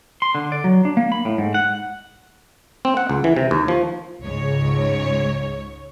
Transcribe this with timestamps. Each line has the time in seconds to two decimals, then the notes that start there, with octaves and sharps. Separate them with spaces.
0.22 C6
0.35 D3
0.52 D5
0.64 F#3
0.85 D4
0.97 A#3
1.12 B5
1.25 A2
1.38 G#2
1.54 F#5
2.85 C4
2.97 F#5
3.09 C#2
3.24 E3
3.37 C3
3.51 D#2
3.68 F3
4.24 C#2 G#2 C#5